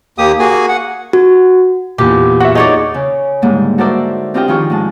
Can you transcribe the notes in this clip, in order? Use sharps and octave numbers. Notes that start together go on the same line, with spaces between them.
D#2 A#3 G4 D#6
A#3 F#4 G#4 G#5
F#5
F#4
E2 A#2 G4
F#4 E5 F#5
D#4 G#4 C#5 D5
C#3
G#2 D3 G3 A#3
F#4 A4 A#4 C5 D5 E5
C4 D4 F4 G4 D#5 G5
D#3 F3 F4 G#4 C#6
G#2 G#3 A5